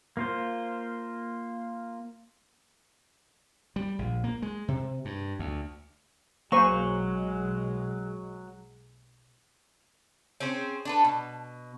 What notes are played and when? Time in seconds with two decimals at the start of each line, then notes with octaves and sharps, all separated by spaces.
0.17 A#3 F4 C5
3.76 G3
3.99 A#1
4.24 A#3
4.42 G#3
4.68 C3
5.05 G2
5.39 D2
6.52 B1 F#3 G#3 A#3 C5 G#5 C#6
10.40 C4 C#4 G#4 C5
10.85 D4 A4 B4
11.05 B2